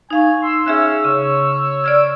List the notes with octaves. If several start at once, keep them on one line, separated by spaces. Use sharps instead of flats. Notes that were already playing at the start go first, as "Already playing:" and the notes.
D#4 F5 G#5 C#6
C6 E6
C#4 G#4 E5 F#6
C#3 C#5
D5 F6 G#6